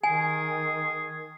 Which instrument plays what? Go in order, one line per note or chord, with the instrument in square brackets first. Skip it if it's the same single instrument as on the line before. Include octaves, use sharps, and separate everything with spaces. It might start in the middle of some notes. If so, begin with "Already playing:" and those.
[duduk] D#3 [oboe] G#4 [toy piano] G#5